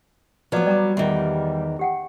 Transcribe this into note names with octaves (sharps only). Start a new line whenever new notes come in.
F3 F#3 B3 B4 D5 D6
G3 D5 A#5 D6
E2 D#3 E5 C6
G4 F#5 G5